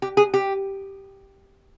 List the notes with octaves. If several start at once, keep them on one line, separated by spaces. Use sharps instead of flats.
G4
G#4
G4